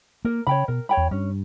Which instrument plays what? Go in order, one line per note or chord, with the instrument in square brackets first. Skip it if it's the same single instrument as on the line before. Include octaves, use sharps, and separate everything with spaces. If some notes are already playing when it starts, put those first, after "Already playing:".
[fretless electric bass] A#3 [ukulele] A#4
[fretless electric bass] C#3 [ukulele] C#5 G5 B5
[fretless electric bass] B2 [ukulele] A#4
[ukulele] C#5 G5 B5
[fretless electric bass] E2
[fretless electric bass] G2 [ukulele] C#4